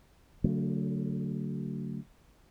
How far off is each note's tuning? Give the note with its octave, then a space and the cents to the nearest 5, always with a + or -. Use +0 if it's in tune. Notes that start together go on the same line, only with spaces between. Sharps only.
D3 -35 F#3 +0 A3 +25